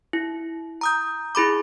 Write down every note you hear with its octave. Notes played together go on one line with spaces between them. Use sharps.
E4
A#5 D#6 G6
E4 G#4 B5 D6